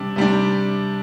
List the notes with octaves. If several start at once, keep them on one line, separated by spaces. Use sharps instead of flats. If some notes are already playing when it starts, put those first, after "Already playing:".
Already playing: C3 G3 D4
C3 G3 D4